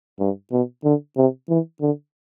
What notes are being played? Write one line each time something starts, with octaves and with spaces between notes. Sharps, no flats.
G2
B2
D3
C3
E3
D3